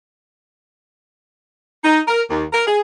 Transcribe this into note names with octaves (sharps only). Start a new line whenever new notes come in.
D#4
A#4
D#2
A#4
G#4